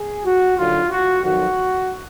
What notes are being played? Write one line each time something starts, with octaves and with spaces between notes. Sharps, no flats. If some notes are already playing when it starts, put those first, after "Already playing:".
Already playing: G#4
F#4
D#2 D3 F#3 F4
F#4
F2 D#3 F#3 F#4